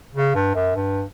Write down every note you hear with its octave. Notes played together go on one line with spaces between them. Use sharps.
C#3
G2
F#2
G2